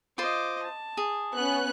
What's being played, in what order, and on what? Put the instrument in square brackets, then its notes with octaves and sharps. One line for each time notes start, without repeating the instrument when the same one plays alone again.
[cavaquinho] F4 C5 [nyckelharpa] D#5 D6
[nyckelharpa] A5
[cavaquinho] G#4
[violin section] B3 C#4 F#6